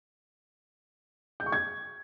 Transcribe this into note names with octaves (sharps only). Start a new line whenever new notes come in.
G6
C#6
G#6